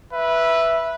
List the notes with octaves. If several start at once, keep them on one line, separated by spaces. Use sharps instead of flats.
B4 E5